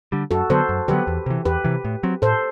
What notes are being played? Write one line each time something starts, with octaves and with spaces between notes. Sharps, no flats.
D3 G3
F#2 F#4 A4
D3 F#3 B3 A4 C5
F#2
D3 F#3 B3 G4 B4
E2
C3 E3
E2 G4 B4
C3 E3
A2
F#3 C4
A2 A4 C5